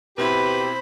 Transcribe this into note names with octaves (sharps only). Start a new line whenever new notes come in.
B2 C4 E4 G4 B4 C5 B5